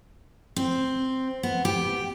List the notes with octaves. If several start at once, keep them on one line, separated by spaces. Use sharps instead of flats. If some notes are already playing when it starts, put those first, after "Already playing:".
C4
B3
G4